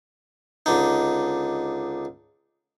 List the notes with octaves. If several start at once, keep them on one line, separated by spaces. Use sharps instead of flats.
C#2 D3 D#4